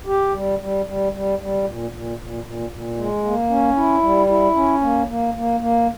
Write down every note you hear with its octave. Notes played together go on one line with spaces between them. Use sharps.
G4
G3
G3
G3
G3
G3
A#2
A#2
A#2
A#2
A#2
G#3
A#3
C#4
E4
G3
E4
C#4
A#3
A#3
A#3
A#3